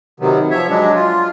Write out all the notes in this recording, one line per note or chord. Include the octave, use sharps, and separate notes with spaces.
C3 D#3 F#3 B3
F3 C#5 E5
F#3 G#3 D4
F4